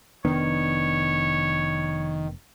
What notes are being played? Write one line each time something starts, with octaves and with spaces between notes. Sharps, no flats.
F1 D#3 B3 D4 C#5